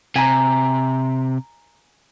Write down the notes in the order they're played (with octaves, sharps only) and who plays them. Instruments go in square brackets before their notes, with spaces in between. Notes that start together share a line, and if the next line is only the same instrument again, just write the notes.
[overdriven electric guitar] C3 [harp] G#5 A#5